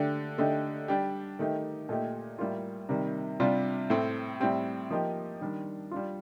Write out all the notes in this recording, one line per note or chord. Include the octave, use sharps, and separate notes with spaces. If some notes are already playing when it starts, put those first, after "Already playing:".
Already playing: D3 A3 D4 G4
D3 A3 D#4 G4
G3 D4 G4
D#3 A3 D#4 G4
A#2 A3 D#4 G4
A2 G3 A#3 F4
C3 D#3 G3
C3 G3 D4 F4
A2 A3 C4
A2 G3 C4 G4
F3 A#3 D#4 G4
D#3 G3 D4
G3 D4 F4